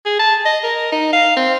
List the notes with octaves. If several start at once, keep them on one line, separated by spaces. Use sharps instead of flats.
G#4
A5
D#5
A#4
D#4
F5
C4